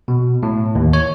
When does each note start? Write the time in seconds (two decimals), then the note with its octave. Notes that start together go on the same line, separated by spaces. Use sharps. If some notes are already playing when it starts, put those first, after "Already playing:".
0.08 B2
0.43 A2
0.75 D#2
0.93 C#5